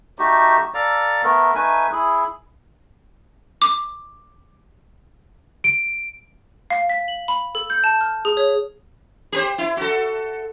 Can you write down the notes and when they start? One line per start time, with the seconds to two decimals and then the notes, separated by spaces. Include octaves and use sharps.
0.19 A3 D#4 F#4 G4
0.74 A4 D5 F5 A#5
1.23 A3 B3 A#4
1.55 A3 D#4 B4 G#5
1.92 E4 G#4
3.62 D6
5.64 D7
6.71 F5
6.89 B6
7.08 F#7
7.28 B5
7.55 A4
7.70 G6
7.84 A5
8.01 F6
8.25 G#4
8.37 C#5
9.32 G4 A#4 C5
9.58 E4
9.77 F#4 A4